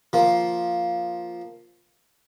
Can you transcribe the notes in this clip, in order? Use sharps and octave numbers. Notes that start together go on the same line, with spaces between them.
F3 A#3